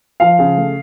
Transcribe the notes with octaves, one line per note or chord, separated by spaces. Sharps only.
F3 F5
C#3
A3